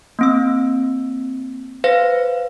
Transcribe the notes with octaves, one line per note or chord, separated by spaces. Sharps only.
A#3 C4 E6
B4 C5 F5 A#6